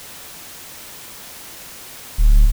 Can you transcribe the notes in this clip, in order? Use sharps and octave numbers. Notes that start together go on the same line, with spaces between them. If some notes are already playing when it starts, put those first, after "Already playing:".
D1